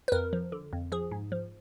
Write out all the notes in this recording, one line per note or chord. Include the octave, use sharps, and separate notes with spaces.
B4
F2 A#4
F3
D3
F2
F3 G#4
G#2
F3